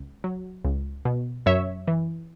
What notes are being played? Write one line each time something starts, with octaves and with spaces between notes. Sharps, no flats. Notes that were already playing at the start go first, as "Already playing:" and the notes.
Already playing: C#2
F#3
C#2
B2
F#2 C#5 E5
E3